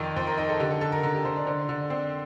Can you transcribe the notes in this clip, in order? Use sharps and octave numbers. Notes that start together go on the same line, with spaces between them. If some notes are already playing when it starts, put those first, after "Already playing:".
Already playing: F2 D#3 D5
F2 C5
A#4
D#4 A#4
A4
D3 G4
A4
D3 A4
A#4
D3 A#4
G4
D3 C5
D5
D3 C5
D3 D5
C4 D5